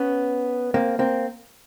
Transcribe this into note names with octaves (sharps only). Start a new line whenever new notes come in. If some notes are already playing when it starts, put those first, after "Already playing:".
Already playing: B3 C#4
A#3 C4
A#3 C4